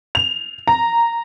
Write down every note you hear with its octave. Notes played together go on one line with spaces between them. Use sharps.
F7
A#5